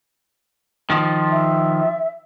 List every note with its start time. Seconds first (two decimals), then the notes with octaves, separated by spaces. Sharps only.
0.90 D#3 F3
1.31 E5